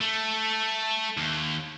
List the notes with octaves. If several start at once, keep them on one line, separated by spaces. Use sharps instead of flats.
A3
D#2